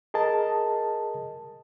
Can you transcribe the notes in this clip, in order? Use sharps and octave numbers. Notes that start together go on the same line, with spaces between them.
G#4 A#4 D#5 A5